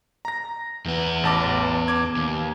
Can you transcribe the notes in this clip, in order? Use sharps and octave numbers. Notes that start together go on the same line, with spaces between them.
A#5 A#6
E2 B3
A1 A5 D6
D6 G#6
D#2